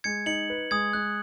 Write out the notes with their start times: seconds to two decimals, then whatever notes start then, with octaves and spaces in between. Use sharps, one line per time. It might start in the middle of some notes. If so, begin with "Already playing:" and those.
0.04 G#3 G#6 C#7
0.26 D#4 C#7 F#7
0.50 B4
0.71 G#3 D#6 G#6
0.93 G#3 F#6